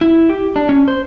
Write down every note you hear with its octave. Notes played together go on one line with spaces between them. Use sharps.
E4
G4
D4
C#4
C5